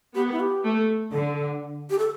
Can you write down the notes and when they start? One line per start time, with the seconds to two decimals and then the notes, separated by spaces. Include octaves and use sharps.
0.15 B3 G4
0.32 E4
0.40 G4
0.63 A3
1.12 D3 A4
1.90 G4
1.99 A4